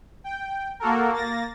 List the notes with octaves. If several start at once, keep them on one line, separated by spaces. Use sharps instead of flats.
G5
A#3 F#4 A4 A#4
A#3 A6 A#6